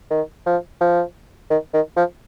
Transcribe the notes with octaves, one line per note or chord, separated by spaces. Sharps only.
D#3
F3
F3
D#3
D#3
F3